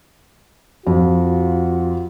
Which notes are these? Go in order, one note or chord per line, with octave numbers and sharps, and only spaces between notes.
F2 F4 F#4